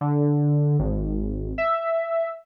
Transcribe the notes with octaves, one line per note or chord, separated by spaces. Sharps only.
D3
G#1
E5